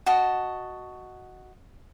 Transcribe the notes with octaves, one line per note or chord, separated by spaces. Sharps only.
F#4 D#5 A5